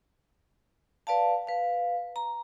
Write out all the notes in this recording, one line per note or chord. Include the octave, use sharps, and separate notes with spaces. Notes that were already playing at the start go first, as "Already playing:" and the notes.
B4 D5 F5 A5
B4 F5
A#5